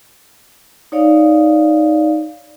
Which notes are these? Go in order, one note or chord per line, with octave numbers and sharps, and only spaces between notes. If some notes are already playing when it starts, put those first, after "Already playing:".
D#4 C#5 D5 F5